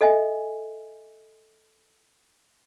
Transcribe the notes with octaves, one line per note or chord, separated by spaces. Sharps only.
A4 D#5 E5 G#5